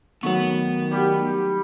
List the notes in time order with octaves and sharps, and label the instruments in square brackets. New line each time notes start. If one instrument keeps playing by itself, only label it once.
[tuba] D#3 [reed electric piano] F#3 A3 C#6 [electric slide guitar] B3 F#5
[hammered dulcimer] G3 G4